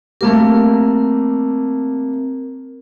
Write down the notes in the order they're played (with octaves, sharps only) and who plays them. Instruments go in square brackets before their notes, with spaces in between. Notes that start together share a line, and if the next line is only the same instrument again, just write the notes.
[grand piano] A3 A#3 G4 [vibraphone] C4 A#4